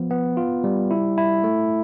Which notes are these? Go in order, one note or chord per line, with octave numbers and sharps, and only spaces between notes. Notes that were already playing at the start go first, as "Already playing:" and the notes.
Already playing: F3 B3
B3
F4
G3
E4
E4
A3